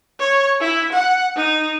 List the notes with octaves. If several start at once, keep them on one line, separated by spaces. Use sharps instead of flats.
C#5
E4
F#5
D#4